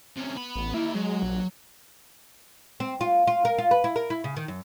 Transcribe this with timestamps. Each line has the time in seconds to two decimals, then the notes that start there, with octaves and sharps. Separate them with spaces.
0.16 C3 C#4
0.36 B3 B5
0.55 A1
0.74 A#3 D#4 E4
0.95 F#3 G#3
1.23 A#1
2.80 C4
3.01 F4
3.27 F4
3.45 A#4
3.58 F4
3.71 B4
3.84 E4
3.96 A#4
4.10 E4
4.24 C#3
4.36 D#3
4.48 F#2